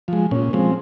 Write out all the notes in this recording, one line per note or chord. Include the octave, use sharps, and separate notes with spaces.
F3 G#3
A#2 C#4
F3 G#3 C4